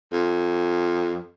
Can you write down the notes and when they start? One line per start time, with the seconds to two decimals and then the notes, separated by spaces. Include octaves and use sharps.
0.12 F2